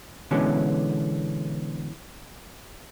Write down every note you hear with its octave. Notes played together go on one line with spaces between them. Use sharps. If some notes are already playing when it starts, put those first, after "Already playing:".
B2 D3 E3 G#3 C#4